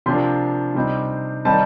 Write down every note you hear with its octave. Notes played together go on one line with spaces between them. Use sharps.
C3 F3 A#3 D4 C6
C3 G3 C4 D#4
D#3 G3 C4 D#4 A5